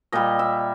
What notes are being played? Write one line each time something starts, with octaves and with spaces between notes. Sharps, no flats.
A#2 G3 D#5
E5